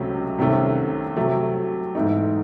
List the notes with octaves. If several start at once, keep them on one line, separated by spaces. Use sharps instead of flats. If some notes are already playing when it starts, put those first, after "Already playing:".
Already playing: C#2 C3 F#3 A3 C#4
C2 C3 D#3 A3 C#4
C3 F#3 A3
G#2 E3 A3 D#4